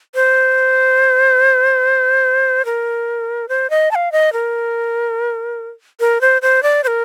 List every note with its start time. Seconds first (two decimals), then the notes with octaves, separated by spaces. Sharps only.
0.15 C5
2.65 A#4
3.49 C5
3.70 D#5
3.91 A5
3.95 F5
4.12 D#5
4.33 A#4
6.00 A#4
6.21 C5
6.42 C5
6.63 D5
6.84 C5
6.87 A#4